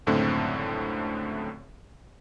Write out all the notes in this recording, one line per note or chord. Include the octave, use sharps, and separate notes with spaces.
C#2 F#2 A2 D3 A3 C4